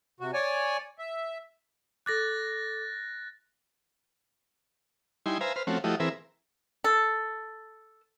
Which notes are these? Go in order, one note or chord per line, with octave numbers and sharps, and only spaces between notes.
C3 F#4
C#5 D5 G#5
E5
A4 D6 F#6 A6 A#6
G3 D#4 E4 G#5 C6
B4 C5 E5 F5 G#5 A#5
B4 C5 F6
F3 A3 C4 C#4 F#4
F3 A3 E4 F#4 G4 D#5
E3 C4 G#4 A#4 B4 E5
A4